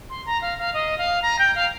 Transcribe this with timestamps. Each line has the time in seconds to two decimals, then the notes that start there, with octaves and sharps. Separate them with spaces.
0.10 C6
0.26 A#5
0.42 F5
0.58 F5
0.74 D#5
0.98 F5
1.22 A#5
1.39 G5
1.55 F5